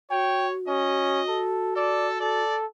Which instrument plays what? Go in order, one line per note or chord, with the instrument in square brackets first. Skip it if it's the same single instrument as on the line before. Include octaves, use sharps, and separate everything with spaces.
[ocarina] F#4 [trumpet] C#5 [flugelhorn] G5
[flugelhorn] C#4 [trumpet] D#5
[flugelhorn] A4
[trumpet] A4 [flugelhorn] D5
[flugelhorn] A4 [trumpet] D5